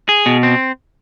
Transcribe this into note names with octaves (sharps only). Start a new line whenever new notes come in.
G#4
B2
C4